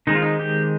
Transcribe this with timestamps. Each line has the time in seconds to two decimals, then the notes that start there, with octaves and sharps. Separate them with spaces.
0.07 D#3 G#3 C4 D#4
0.15 F4
0.22 D#4
0.39 G4